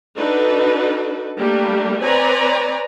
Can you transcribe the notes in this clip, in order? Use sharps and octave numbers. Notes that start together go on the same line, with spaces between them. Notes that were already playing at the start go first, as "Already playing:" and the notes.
D4 D#4 F#4 A4 B4
G3 A3 A#3 D4 G4
C4 B4 C#5 D5 G#5 A#5